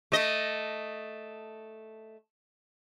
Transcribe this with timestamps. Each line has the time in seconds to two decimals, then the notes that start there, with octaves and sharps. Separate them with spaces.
0.12 A3 D#5